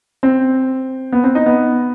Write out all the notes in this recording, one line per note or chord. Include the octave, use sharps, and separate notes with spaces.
C4
B3
C4
D#4
B3